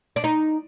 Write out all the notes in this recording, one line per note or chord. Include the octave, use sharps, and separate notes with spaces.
D4
D#4